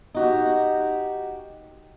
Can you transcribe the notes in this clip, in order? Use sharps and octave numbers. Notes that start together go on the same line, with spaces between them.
D#4 F#4 G4